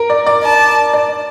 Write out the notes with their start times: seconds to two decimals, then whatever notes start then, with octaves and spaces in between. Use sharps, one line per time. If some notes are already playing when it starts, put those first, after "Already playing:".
Already playing: A#4
0.10 D5
0.26 D5
0.43 A5
0.94 D5